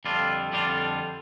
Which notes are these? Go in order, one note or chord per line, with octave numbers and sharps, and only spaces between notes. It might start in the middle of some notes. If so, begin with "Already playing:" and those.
F2 D3 G3 D4 F4
F2 D3 G3 D4 F4